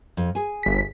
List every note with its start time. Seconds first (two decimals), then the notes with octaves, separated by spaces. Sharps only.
0.17 F2
0.35 G#4 G#5
0.63 G1 B6